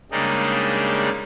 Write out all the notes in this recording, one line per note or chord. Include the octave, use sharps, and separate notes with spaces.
C#3 G3 G#3 A#3 D4 D#4